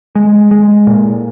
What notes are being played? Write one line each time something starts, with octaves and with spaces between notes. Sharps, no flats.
G#3
G#3
A#2